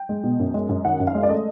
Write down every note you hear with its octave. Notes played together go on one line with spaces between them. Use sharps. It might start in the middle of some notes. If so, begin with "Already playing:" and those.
Already playing: G5
G#3
B2
F#2
G#3
F#2
D#3 F#5
F#2
F5
G#3
D5
A3 D#5